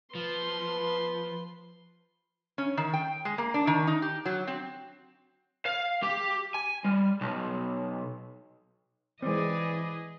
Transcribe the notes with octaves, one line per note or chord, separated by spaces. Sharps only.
F3 B4 C6
C#4
D#3
G5
G#3
A#3
D4
D#3
D#4
G4
F#3
C4
F5
G4
G#5
G3
B1
E3 G#3 C4 G#4 B4 D5 D#5